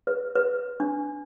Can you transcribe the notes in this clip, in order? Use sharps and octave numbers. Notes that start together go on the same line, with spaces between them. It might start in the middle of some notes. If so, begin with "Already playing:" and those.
B4
B4
D4